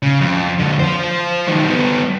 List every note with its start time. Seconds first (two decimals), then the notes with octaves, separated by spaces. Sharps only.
0.02 C#3
0.21 F2
0.59 F2 D3
0.80 F3 C5
1.48 D#3 F#3
1.64 G3 B3